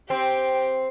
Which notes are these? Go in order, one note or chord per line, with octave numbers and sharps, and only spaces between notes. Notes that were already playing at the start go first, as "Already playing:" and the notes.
C4 G4 G5